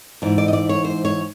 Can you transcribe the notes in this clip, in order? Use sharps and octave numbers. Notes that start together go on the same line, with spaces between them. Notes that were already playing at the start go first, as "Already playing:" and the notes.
G#2 E3 D5
D5
D#5
D5
C#5
C5
C#5